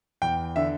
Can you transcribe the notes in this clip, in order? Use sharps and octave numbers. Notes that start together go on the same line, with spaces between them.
E2 G5
D3 E5